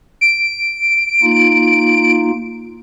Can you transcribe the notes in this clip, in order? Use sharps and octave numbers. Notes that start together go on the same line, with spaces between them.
D7
A#3 D#4 F4